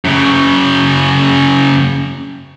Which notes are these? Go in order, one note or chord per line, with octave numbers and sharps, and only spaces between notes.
F#2 C#3